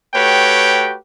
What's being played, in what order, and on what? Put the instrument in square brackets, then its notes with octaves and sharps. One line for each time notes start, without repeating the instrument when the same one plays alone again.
[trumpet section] A3 F#4 G4 B4 C#5 G5